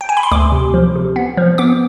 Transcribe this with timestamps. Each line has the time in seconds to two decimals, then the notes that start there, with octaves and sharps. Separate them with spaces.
0.01 G5
0.09 G#5
0.17 B5
0.23 C6
0.32 D2 D6
0.52 C3
0.74 F3
0.96 C3
1.16 B3
1.37 F3
1.58 B3 D6